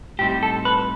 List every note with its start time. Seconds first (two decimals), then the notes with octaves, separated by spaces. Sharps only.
0.19 A2 G3 C4 D#4 G4
0.43 A4
0.65 B4